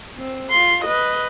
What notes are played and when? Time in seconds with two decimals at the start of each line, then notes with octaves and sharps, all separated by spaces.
0.17 C4
0.50 F4 C6
0.85 B4 D#5